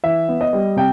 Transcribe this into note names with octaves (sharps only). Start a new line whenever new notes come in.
E3 E5
B3
D#5
G3
C3 G5